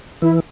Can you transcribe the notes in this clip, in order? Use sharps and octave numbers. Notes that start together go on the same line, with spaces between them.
E3 E4